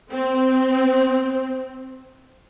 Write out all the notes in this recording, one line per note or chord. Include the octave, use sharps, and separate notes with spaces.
C4